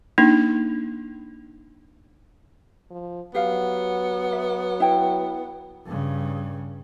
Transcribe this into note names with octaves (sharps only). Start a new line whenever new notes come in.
A#3 D4 D#4
F3
F#3 B3 G4 F5
E5
E4 G5
G2 C#3